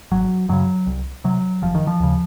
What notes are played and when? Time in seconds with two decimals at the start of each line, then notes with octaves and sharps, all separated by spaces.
0.11 G#1 F#3
0.49 F#2 C#3 F#3
0.87 C2
1.24 C3 F#3
1.62 F1 F3
1.75 D#3
1.87 F3
2.00 D#2 C#3